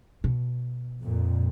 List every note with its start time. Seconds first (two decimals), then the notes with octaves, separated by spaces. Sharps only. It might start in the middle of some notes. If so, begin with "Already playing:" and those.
0.24 B2
1.02 F2 A#2